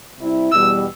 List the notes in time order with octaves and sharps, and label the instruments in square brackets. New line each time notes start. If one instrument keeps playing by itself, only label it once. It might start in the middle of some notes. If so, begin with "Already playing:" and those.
[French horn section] C3 G3 C4 E4
[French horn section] E2 B2 G3 [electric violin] E6